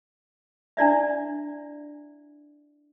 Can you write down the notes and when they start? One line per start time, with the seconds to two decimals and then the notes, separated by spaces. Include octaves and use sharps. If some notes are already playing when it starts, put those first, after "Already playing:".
0.77 D4 E4 D5 E5